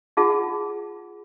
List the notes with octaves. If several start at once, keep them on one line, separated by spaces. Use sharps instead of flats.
D#4 F4 G#4 F#5 A5